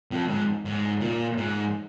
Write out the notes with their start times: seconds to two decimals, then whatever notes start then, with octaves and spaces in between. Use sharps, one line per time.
0.11 F2
0.29 G#2
0.65 G#2
1.01 A#2
1.37 G#2